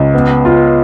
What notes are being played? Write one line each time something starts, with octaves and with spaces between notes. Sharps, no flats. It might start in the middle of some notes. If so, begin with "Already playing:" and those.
Already playing: C#2
B3
F4